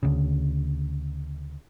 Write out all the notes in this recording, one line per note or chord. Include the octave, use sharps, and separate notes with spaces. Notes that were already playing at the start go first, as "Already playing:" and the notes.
D2 C#3